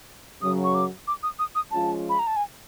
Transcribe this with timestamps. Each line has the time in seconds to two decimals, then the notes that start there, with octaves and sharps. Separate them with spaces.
0.41 F#2 C#3 F#3 D#6
0.64 C#6
0.75 D6
1.07 D6
1.23 D#6
1.39 D#6
1.55 D#6
1.71 F3 G#3 C#4 F4 A5
2.09 B5
2.19 A#5
2.27 A5
2.36 G#5